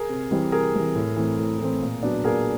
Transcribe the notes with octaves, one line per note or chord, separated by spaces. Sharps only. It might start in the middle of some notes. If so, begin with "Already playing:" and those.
Already playing: G#4 A#4
C3
E3 G3 C4
C3 G#4 A#4
E3 G3 C4
A2
E3 A3 C4
A2
E3 A3 C4
A#2
F#3 B3 D4
A#2 G#4 A#4